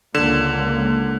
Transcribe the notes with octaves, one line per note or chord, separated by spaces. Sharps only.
C#2 D3 A#3 E7